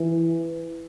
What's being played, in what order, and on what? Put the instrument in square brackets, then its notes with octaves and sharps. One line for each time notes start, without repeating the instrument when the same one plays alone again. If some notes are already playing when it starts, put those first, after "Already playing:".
Already playing: [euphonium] E3